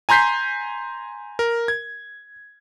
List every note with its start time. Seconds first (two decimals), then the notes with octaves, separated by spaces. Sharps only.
0.09 G#5 A#5 C6 G6 B6 C7
1.39 A#4
1.68 G#6